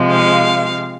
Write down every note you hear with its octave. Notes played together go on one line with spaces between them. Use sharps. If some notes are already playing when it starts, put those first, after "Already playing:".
Already playing: C3 F3 G#3
F5